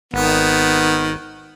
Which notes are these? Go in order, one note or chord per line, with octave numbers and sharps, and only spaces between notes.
G#1 D#3 B3